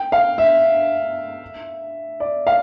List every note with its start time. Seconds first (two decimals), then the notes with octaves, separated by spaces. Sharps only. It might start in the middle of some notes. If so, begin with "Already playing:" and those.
Already playing: G5
0.12 F5
0.38 E5
2.20 D5
2.47 F5